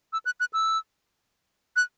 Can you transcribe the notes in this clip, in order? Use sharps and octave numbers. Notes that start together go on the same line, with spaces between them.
E6
F#6
F#6
E6
F#6